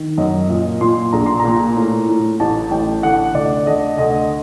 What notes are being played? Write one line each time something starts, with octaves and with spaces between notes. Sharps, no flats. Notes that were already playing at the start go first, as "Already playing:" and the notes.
Already playing: D#3
F#2 D#5
A#2 D#5
A#2 C6
A#1 A#5
C6
A#5
A#2
A2
A2
A1 A5
A1 G5
D3 F#5
D2 D5
D3 D#5
D2 D#5